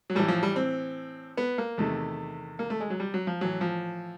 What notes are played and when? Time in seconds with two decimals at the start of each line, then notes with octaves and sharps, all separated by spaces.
0.10 F#3
0.15 A2 E3 G3
0.28 F3
0.43 G3
0.56 C4
1.37 B3
1.58 A#3
1.78 E2 C3 D#3 A3
2.59 A#3
2.70 A3
2.80 G#3
2.90 F#3
3.00 G3
3.14 F#3
3.27 F3
3.41 A2 E3 F#3
3.61 F3